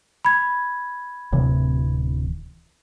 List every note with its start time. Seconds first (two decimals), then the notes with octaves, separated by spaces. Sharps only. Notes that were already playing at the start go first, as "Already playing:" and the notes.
0.25 B5 G#6
1.32 D1 C3 E3